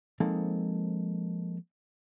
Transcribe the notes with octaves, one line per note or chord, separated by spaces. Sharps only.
F3 G#3 A#3 C4 D#4 A4